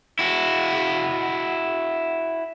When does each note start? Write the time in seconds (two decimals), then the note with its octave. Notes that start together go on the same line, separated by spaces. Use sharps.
0.19 E4 F#4